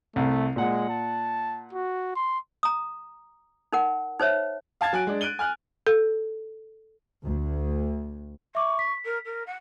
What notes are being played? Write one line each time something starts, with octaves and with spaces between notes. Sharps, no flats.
C2 A3
A#2 G#3 F#5
A5
F#4
C6
A#5 D#6
D#4 A#4 F#5
D#4 C5 C#5 E5
F5 A5 G#6 A6
F#3 G#5 F#6 D7
G#3 D4
F#6 D7 D#7 G7
G#5 F6 F#6
A4
D2
E5 C#6 D6
B6
A#4
A#4
F#5